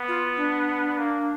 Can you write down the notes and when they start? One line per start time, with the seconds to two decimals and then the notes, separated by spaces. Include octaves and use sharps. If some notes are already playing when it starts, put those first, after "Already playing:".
Already playing: B3
0.08 F4
0.37 D4
0.98 A#3